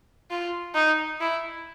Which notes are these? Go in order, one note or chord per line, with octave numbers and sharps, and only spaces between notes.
F4
D#4
E4